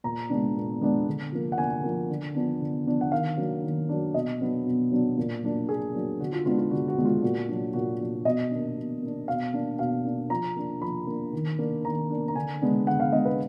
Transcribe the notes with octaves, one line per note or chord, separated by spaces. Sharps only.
A#2 A#5
G#3 B3 D4
A#2
G#3 B3 D4
D3
F3 A#3
F#5
D3 G#5
F3 A#3
D3
F3 B3 D4
D3
F3 B3 D4
F#5
D#3 F5
F#3 A#3 D4
D#3
F#3 A#3 D4
B2 D#5
F#3 B3 D4
B2
F#3 B3 D4
A#2
F#3 A#3 D4
A#2 G#4
F#3 A#3 D4
D3 F#4
F4
G#3 B3 D4 F4
F4
D3 F#4
F#4
G#3 B3 D4
F4
A#2 F#4
F#3 D4
A#2 F#4
F#3 D4
B2 D#5
A#3 D4
B2
A#3 D4
B2 F5
A#3 D4
B2 F5
A#3 D4
F3 A#5
A#3 D4
F3 B5
A#3 D4
D#3
A#3 D4
D#3 A#5
A#3 D4
A#5
D3 G#5
G#3 B3 D4
D3 F#5
F5
G#3 B3 D4 D#5
B4